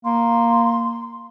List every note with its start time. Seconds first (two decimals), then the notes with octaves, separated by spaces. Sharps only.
0.05 A#3 C6